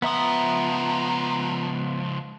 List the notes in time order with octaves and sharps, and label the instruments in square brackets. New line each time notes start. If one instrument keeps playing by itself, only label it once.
[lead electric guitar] C#2 F3 [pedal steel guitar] B3 E5 D#6 [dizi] A#5